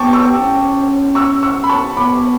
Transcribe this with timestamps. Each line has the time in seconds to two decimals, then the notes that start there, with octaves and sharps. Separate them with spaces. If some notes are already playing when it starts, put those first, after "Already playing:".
Already playing: B3 G5 A5 C#6 D6
0.13 C#6 E6
0.34 C#4
1.15 C#6 E6
1.43 C#6 E6
1.64 B5
1.69 A5 C#6
1.97 B3 B5 D6